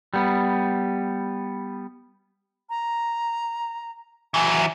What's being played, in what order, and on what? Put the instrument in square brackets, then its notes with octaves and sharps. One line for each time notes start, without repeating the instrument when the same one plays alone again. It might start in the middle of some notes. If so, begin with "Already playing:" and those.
[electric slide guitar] G3 B3
[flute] A#5
[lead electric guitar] E3 F#3 [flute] G#5